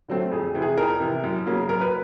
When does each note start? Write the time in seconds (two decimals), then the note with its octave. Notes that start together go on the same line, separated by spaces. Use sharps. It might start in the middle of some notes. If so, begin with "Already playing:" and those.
0.08 D3 F#3 A3 C4
0.32 F2 G#4
0.55 C3 E3
0.62 G#4
0.77 F2 A#4
1.00 C3 E3
1.24 F#2
1.46 C#3 F#3 A#3
1.69 F#2 A#4
1.81 B4